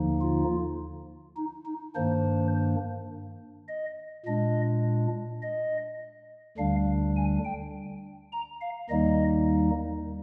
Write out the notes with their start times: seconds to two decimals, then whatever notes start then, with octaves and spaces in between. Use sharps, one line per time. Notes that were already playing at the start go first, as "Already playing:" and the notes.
Already playing: D#2 D3 F3 A#3 D#4
0.21 F4
1.37 D#4
1.65 D#4
1.95 G2 D#3 A#3 D4 C5
3.68 D#5
4.26 A#2 G#3 D4 D#5
5.42 D#5
6.58 D2 D3 G3 D4 F5
7.17 G#5
7.45 G5
8.32 A#5
8.61 F5
8.89 D#2 D#3 G3 A#3 D#4 D#5